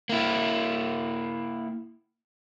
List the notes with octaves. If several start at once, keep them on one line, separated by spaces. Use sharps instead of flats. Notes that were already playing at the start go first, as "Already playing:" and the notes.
A#3 E4